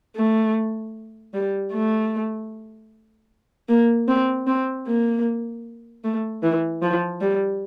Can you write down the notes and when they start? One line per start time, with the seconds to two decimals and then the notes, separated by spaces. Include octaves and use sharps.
0.16 A3
1.34 G3
1.72 A3
3.69 A#3
4.08 C4
4.47 C4
4.87 A#3
6.04 A3
6.43 E3
6.82 F3
7.21 G3